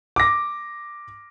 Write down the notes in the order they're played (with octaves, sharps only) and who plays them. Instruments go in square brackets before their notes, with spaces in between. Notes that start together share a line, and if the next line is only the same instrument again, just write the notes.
[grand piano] D6 A#6